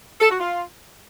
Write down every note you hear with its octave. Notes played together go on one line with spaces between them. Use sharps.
A4
F#4
F4